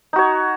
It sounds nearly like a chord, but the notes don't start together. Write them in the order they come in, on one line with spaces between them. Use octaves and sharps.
D#4 F#4 C#5